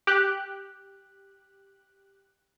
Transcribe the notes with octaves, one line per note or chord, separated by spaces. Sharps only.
G4 F#6